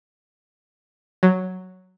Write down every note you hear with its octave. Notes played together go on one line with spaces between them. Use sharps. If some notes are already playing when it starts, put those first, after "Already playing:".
F#3